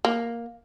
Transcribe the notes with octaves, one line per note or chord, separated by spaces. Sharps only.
A#3